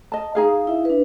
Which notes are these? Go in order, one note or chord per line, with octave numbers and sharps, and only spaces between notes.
D#5 A5
D#4 G#4 F5
E4 E5
D4 B4